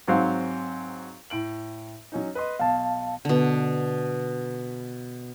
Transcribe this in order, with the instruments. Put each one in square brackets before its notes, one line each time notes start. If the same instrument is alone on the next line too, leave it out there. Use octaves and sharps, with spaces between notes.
[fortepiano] G#2 F#3 C4 F5
[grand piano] A2 D7 F#7
F#3 C#4 D#4
B4 D#5 C6
[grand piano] B1 [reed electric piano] F5 A5
[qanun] B2 D3